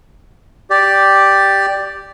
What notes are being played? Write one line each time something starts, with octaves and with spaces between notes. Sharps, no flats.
G4 D5